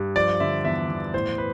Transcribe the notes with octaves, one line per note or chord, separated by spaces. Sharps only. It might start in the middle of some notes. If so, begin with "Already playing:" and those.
Already playing: G2
F3 D5
D3 E5
E2 E5
E2
A2 C5
B4